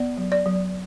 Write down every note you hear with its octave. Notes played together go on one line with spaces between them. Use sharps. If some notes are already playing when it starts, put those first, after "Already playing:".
Already playing: B3 D5
F#3
D5
F#3